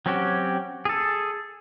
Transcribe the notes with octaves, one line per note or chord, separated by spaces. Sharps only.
F#3 C4 C#4 F#4 G4
G#4 A4